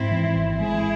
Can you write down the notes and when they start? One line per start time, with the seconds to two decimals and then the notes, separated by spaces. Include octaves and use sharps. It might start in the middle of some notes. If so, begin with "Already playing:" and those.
Already playing: G#2 C4 E4
0.11 E3
0.36 G#1
0.60 G#3 E4 G#4